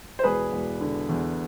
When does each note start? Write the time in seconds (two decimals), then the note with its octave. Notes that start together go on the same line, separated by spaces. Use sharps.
0.19 C5
0.24 E1 G#4 B4
0.52 E1
0.81 D3
1.09 E2